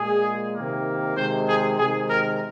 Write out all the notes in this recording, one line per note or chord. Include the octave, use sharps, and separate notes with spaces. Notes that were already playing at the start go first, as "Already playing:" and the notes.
Already playing: A#2 G#3 G#4
C3 D#3 A#3
C3 D#3 G#3 C5
G#4
C3 D#3 G#3 G#4
A#4